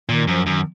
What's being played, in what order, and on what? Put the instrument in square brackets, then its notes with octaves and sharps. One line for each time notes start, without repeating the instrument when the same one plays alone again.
[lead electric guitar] A#2 [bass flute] D#3
[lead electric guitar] F#2 [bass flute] F3
[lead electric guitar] F#2 [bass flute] D#3